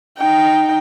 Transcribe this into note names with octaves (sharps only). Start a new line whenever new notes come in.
D#4 G5